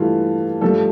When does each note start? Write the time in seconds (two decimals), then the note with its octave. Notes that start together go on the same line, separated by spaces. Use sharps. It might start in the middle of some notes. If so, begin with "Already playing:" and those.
Already playing: G2 E3 A3 F4
0.61 G2 F3 A3 A4